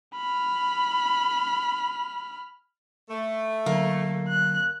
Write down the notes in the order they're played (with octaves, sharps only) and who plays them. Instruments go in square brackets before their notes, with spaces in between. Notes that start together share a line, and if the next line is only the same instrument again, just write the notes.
[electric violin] B5 F6
[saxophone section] A3
[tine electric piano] D3 F#3 [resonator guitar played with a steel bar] A#3
[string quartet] F#6